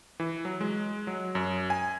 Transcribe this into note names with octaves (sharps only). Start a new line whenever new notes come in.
E3
F#3
G#3
F#3
F#2
G#5